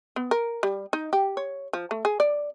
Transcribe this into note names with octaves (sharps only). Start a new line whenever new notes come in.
B3
A#4
G3
D#4
G4
C#5
F3
A3
G#4
D5